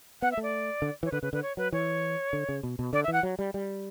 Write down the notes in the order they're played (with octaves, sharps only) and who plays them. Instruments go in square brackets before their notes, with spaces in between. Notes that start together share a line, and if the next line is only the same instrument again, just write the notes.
[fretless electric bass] B3 [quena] F#5
[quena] E5
[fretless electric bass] A3
[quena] D5
[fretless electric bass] D3
[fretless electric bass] E3 [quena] C#5
[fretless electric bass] D3 [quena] B4
[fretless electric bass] C#3 [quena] B4
[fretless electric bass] D3 [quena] B4
[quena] C#5
[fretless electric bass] F#3 [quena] B4
[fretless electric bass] E3 [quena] C#5
[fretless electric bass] D3
C#3
B2
B2
[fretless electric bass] D3 [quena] D5
[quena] E5
[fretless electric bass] E3 [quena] F#5
[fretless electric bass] F#3
G3
G3